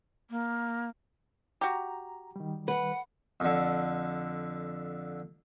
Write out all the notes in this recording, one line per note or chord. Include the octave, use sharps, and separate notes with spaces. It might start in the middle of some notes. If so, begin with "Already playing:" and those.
A#3
F#4 G4 A#5
D#3 G3
B4 F#5
F2 D3